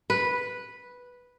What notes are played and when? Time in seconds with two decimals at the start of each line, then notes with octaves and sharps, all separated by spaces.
0.10 B4